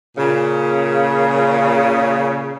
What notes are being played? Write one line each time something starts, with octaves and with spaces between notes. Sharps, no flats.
A#2 C#3